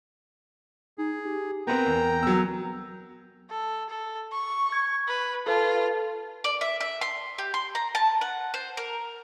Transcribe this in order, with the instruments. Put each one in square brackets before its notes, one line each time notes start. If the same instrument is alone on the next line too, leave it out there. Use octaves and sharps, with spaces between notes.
[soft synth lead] D#4 [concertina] G#4
[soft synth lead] G4
[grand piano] B3 C4 [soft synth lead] A#4 [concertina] G5 A#5
[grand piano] E2
[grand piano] F#3 E6 [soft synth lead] B3
[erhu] A4
A4
C#6
[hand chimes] G#6
[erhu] B4
[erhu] F4 [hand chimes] A4 B4 A5
[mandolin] D5
E5
E5
C6
G4
C6
A#5
A5
F#5
C5
A#4